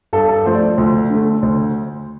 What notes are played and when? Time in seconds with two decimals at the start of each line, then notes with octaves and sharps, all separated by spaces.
0.13 G2 A4
0.29 A4
0.46 F3 A3 C5
0.54 D5
0.61 C5
0.78 D2
1.10 D3 A3
1.42 D2